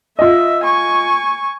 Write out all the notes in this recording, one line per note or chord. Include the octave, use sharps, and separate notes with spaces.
F4 D#5 E5
G#5 C#6